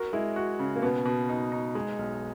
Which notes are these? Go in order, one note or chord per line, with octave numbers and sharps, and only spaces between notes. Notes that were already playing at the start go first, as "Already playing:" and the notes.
Already playing: F#4 A#4
G#3 E4
F#4
C#3
A#3
B2 B3
B2
D#4
D#4
G#3
B1